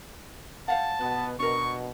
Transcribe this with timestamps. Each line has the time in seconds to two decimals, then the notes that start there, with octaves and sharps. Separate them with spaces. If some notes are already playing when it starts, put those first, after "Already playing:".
0.68 C5 F5 F#5 A5
1.00 B2 B3 F#4
1.40 B2 D4 A#4 C#6